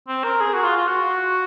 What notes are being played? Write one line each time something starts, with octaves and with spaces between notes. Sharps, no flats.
C4
A#4
G#4
F#4
F4
F4
F#4